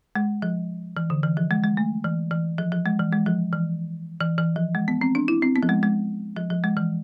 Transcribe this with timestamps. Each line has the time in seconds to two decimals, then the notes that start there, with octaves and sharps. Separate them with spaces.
0.15 G#3
0.42 F3
0.97 E3
1.10 D3
1.23 E3
1.37 F3
1.51 G#3
1.64 G#3
1.77 A3
2.04 E3
2.31 E3
2.58 F3
2.72 F3
2.86 G#3
2.99 E3
3.12 G#3
3.26 F3
3.53 E3
4.20 E3
4.38 E3
4.56 F3
4.75 G#3
4.88 B3
5.01 C4
5.15 D4
5.28 E4
5.42 C4
5.56 B3
5.63 F3
5.69 G#3
5.83 G#3
6.36 F3
6.50 F3
6.64 G#3
6.77 E3